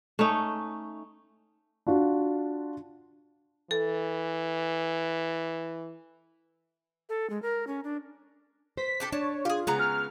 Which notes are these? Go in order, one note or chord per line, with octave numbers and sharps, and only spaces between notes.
A3 C#4 D#4
D4 F4 F#4
E3 A4
A4
G#3
A#4
C#4
D4
C5 B6
D4 G4 A4
D4 C#5 A5
F4 G4 G#4
C#3 G#3 B3 A#5
F6